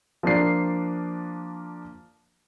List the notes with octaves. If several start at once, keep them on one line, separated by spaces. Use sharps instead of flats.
F3 A#3 D4 C7